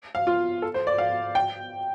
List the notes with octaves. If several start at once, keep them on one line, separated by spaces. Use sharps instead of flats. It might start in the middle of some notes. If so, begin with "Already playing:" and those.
F5
F4
A4
C5
D5
F5
G5